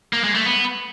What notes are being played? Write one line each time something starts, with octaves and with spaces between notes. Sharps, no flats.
A#3
G#3
A3
B3